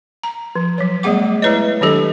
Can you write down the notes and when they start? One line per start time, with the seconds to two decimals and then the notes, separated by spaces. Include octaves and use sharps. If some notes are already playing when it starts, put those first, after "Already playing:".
0.23 A#5
0.56 F3
0.78 F#3 C#5
1.03 G3 A3 B3 G#4 F#5 D6
1.42 G#3 E4 B4 C#5 D#5
1.81 D#3 F#3 D4 G4 A4 D#5